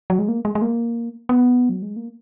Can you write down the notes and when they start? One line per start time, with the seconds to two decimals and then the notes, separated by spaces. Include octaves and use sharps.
0.10 F#3
0.19 G#3
0.28 A#3
0.45 G#3
0.55 G#3
0.62 A#3
1.29 B3
1.69 F#3
1.82 G#3
1.96 A#3